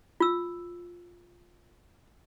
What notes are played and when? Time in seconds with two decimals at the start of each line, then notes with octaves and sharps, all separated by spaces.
0.20 F4 E6